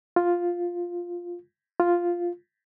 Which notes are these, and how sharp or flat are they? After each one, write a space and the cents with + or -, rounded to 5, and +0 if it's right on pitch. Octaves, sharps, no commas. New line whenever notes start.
F4 +5
F4 +0